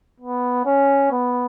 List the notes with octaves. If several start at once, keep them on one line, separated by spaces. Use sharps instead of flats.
B3
C#4
B3